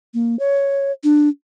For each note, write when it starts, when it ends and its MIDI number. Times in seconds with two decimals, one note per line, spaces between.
0.14 0.38 58
0.39 0.91 73
1.04 1.29 62